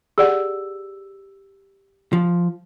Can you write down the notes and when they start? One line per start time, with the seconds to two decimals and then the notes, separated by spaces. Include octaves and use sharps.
0.18 G4 G#4 D5 F#5 E6
2.13 F3